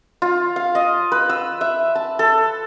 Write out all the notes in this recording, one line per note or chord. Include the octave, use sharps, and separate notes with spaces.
F4
F5
D#5
B4
E6
E5
A5
A4